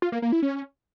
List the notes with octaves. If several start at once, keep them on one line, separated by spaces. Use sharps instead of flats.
F4
A#3
A#3
E4
C#4